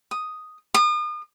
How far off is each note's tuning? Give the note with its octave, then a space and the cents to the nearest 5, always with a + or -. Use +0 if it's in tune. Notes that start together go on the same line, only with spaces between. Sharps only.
D#6 +0
D#6 -40